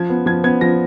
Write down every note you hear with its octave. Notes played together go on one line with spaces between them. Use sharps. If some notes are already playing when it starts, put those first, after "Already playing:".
Already playing: F3 G#6
B3
F3 G#6
B3 G#6
F3 A#6